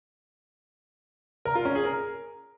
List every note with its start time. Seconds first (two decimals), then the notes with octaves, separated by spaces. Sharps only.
1.45 A#4
1.55 F4
1.65 C#4
1.75 G#4
1.85 A#4